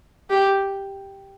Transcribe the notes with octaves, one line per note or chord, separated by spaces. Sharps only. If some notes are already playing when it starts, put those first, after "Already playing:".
G4